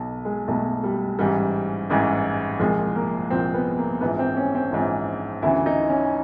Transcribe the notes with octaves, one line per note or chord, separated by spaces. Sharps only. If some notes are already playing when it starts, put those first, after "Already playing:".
Already playing: B1 B2
G#3
B1 B2 A3
G3
A1 G#2 E3 G3
A1 G#2 E3
C2 A#2 F3 G#3
A#3
C2 A#2 F3 C4
B3
A#3
A#1 G#2 E3 B3
C4
C#4
C4
A#1 G#2 E3
D2 C#3 E3 E4
D#4
C#4